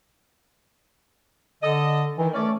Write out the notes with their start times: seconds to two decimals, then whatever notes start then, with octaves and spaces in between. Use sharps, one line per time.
1.63 D3 A4 D#5
2.18 D#3 E3
2.34 A3 C#4 D5